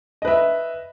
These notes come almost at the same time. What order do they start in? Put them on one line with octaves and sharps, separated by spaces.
D#5 B4 E5